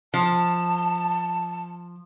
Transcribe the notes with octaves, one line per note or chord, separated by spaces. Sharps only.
F3 A5